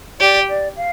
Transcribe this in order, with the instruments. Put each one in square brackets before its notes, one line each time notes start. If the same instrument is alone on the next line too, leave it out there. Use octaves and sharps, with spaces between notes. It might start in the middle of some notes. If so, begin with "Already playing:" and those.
[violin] G4 [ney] D5
[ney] D5
F5